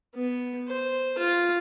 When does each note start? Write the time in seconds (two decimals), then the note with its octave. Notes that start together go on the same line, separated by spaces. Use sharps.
0.15 B3
0.68 C5
1.18 F4